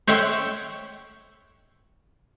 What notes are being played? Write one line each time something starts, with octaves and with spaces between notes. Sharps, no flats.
C5 C#5 E5 F#5 G5